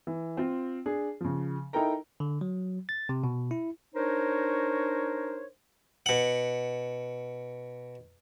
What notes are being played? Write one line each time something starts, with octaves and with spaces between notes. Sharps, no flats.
E3
C4 F4
D4 G#4
C#3 F3
D#4 E4 A4 A#4 G5 A#5
D3
F#3
A6
C3
B2
E4
D4 D#4 A#4 C5 C#5
B2 F#5